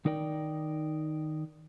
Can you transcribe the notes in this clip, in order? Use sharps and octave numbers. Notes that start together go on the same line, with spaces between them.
D#3 D#4 A#4 D5 G5